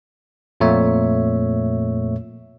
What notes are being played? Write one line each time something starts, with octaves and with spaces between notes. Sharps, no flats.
F2 A#2 A3 C#5 E5